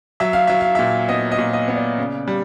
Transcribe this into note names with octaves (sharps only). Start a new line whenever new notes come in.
F#3 E5
F5
F#3 E5
F5
A#2 E5
B3 D#5
D#5
A#2
D#5
B3
D5
C#3
G3